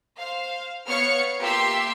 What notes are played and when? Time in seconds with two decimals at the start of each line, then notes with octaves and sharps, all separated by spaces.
0.17 C5 F5
0.87 B3 C#5 F5 F6 C#7
1.39 A#3 F4 G4 E5 C6 E6